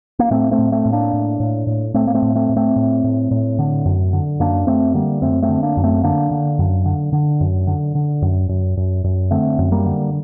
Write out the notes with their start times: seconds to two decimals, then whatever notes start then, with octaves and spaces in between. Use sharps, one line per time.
0.19 A#3
0.31 A2 A3 C4
0.51 A3 C4
0.59 A2
0.72 A3 C4
0.86 A2
0.92 A#3 D4
1.13 A2
1.40 A2
1.67 A2
1.94 A2 A3 C4
2.07 A#3
2.14 A3 C4
2.22 A2
2.35 A3 C4
2.49 A2
2.56 A3 C4
2.76 A2
3.04 A2
3.31 A2
3.59 D3
3.85 F#2
4.13 D3
4.40 F#2 A#3 D4
4.67 F#2 A3 C4
4.94 D3 G3 A#3
5.22 F#2 A3 C4
5.42 A3 C4
5.49 D3
5.63 A#3 D4
5.77 F#2
5.83 A3 C4
6.03 D3 A#3 D4
6.31 D3
6.59 F#2
6.85 D3
7.13 D3
7.41 F#2
7.67 D3
7.95 D3
8.22 F#2
8.49 F#2
8.77 F#2
9.04 F#2
9.31 D3 A3 C4
9.59 F#2
9.72 G3 A#3
9.86 D3